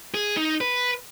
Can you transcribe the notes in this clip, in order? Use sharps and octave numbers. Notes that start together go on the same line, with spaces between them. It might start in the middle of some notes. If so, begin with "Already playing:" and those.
G#4
D#4
B4